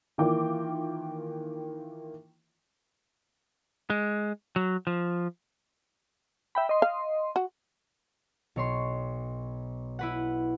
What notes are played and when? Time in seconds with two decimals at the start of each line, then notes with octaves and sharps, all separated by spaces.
0.18 D#3 E3 A#3 F4 G5 D6
3.90 G#3
4.56 F#3
4.87 F3
6.55 E5 G5 B5
6.69 D#5 C6
6.82 F5
7.36 F#4
8.56 B1 C#5 C6
9.99 E4 B4 F#5